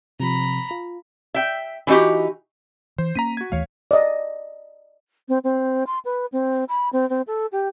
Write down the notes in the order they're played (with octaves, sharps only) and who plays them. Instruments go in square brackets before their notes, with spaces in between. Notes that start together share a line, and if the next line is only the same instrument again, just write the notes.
[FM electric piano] C3 F3 [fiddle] A#5 B5
[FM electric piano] F4
[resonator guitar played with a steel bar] E5 G5
E3 A3 D#4 F#4 G4
[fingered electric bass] E3 [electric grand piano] C5
[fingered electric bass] A#3 C#4 [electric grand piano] A#5 B6 D#7
[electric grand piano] F#4 G#6
[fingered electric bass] D#2 E3 A3 [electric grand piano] C#5 F5
[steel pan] D5 D#5
[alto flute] C4
C4
C6
B4
C4
B5
C4
C4
A4
G4